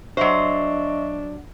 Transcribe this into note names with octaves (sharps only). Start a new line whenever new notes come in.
F#3 D4 C5 D#5 E5 C#6